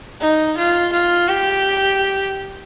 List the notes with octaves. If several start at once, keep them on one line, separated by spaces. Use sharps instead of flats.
D#4
F4
F4
G4